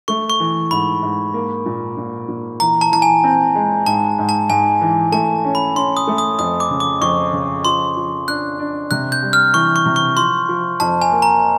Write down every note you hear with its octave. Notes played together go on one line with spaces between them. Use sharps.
A3 C#6
C#6
E3
G#2 B5
G#2
A#3
A#2
A#2
A#2
E3 A#5
A5
E3 A5
G#5
C4
G#3
G#2 A5
G#2
A5
G#2 G#5
E3
A3 A5
C#4
B5
C#4 C6
D#6
A3
D#6
F2 D#6
D6
C#3
D6
F2 C#6
C#3
F3 C6
F3
D4 F#6
D4
C3 F#6
G6
G3
F6
E3 C#6
C#6
C3
C#6
F3 C6
F3
F2 A5
G#5
A#3
A#5